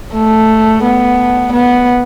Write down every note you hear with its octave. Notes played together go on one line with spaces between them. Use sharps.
A3
B3
B3